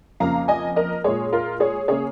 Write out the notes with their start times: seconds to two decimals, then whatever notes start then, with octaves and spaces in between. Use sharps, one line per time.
0.20 F2 C#3 A#3 F5 A#5
0.48 D#5 G#5
0.76 A#4 D#5
1.04 A#2 G#3 G#4 C#5
1.32 F4 A#4
1.60 G#4 C#5
1.88 C#3 A#3 G#4 C#5